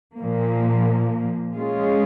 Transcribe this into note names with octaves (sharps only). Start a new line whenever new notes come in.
A#2 F3 A#3
G#3 C#4 F4 G#4